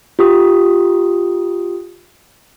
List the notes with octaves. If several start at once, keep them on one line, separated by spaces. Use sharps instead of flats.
F4 G4 D#6